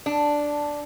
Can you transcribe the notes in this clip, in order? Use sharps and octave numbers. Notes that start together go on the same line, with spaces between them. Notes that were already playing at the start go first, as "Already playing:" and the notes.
D4